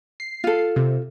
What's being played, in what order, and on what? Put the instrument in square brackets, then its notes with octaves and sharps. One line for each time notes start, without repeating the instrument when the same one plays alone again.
[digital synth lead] C7
[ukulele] F4 A4
[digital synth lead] C3